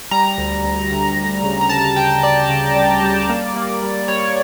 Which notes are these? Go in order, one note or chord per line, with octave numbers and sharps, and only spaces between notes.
G3 A#5
D2
D2
D2
D2
C#3
A#5
D2 A5
G3 G5
G3 D5
C#3
G3
G3
A#3
A#3
G3
G3 C#5